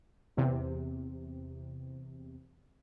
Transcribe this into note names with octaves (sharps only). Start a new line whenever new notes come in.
E2 C3